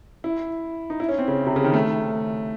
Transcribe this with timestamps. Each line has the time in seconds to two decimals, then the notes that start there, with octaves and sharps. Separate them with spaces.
0.24 E4
0.90 D#4
1.00 E4
1.09 C#4
1.18 C4
1.28 C#3
1.47 C3
1.56 C#3
1.64 D#3
1.73 A3